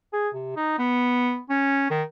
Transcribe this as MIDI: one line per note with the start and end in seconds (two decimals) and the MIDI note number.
0.13 0.29 68
0.34 0.56 48
0.56 0.74 63
0.78 1.39 59
1.49 1.88 61
1.90 2.03 51